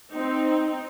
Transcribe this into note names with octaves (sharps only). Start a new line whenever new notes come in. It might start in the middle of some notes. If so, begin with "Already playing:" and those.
C4 D#4